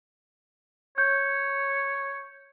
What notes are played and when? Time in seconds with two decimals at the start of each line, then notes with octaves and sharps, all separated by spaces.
0.98 C#5 G6